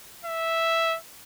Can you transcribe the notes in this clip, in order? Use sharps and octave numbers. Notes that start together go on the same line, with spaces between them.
E5